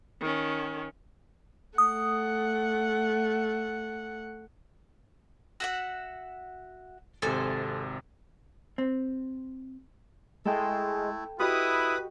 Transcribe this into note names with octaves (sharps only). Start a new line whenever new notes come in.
D#3 C#4
A3 F#5 D#6
F#4 E5 F#5
G#1 C3 A4 C5 G#5
C4
G#3 A3 E4 A4 G5
E4 F#4 G4 B4 D#5 B5 D#6